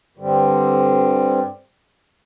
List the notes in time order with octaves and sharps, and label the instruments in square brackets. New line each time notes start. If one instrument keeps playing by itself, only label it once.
[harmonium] G2 D3 G3 C4